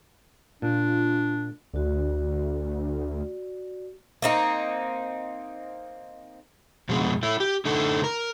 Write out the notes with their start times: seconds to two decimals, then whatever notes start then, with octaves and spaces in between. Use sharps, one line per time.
0.62 A#2 D4 F4
1.74 D2 F#4 D5
4.22 A#3 C4 D#4
6.89 F2 B2 G#3
7.23 A3 E4
7.40 G4
7.65 D3 A3 D#4 A4
8.04 A#4